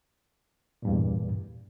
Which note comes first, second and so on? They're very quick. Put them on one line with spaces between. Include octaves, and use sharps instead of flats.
A#2 G2 E2